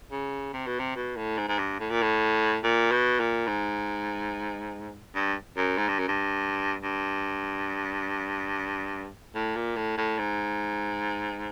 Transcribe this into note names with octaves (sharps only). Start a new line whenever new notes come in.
C#3
C3
B2
C3
B2
A2
G#2
G#2
G2
A2
A#2
A2
A#2
B2
A#2
G#2
G2
F#2
G#2
G2
F#2
G2
G2
A2
A#2
A2
A2
G#2